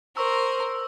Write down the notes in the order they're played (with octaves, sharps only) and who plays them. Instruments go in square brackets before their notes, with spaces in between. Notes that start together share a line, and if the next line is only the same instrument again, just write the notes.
[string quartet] A#4 C5 [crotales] C#6 E6